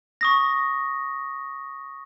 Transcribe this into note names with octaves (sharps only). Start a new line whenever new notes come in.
C#6 D#6 A#6